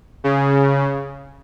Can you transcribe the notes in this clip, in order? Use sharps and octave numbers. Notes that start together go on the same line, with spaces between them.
C#3